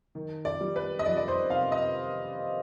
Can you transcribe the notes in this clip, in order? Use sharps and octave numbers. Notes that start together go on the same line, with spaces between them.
D#3
D5
G3
B4
D#5
F2 D5
D5
C5
C3 F5
D#5